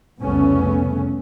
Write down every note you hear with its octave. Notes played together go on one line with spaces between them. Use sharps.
F1 C2 C#3 A3 B3 C#4